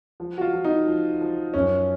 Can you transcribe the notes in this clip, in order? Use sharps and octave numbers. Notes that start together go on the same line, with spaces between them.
F3
F#4
F4
F3
D#4
F3
F3
F#2 C#4